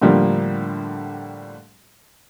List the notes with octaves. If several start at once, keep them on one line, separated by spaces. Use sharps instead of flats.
A2 D3 F3 G3 A#3